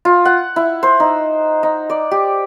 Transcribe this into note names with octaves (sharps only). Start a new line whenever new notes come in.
F4
F#5
E4
C5
D#4
D#4
D5
G4